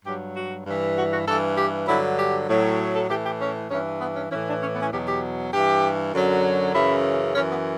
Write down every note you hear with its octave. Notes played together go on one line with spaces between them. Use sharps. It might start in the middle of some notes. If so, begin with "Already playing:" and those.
G2 F#3 G4
F#4
G2 E3
F#4
F#4
G2 E3 A4
G4
G2 D3 F#3 E4
G4
A2 F#3
A4
A2 E3 G4
G4
C#4
G2 E3 C#4
B3
C#4
A2 E3 C#4
D4
C#4
B3
C#4
E2 B2 F#3 G4
G4
G2 E3 G4
F#2 D3 F#3
F#2 C#3 E3 E4
F#2 E3 C#4
B3